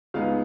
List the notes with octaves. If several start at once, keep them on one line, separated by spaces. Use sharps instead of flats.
C#2 C#3 G#3 B3 D#4 F5